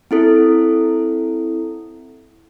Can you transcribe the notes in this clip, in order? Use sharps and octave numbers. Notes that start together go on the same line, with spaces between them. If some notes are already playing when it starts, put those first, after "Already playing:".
C4 E4 A4